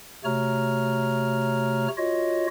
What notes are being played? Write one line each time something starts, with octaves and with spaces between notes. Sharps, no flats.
C3 A3 F#4 C#5 A#5 F6
F4 F#4 C#5 D#5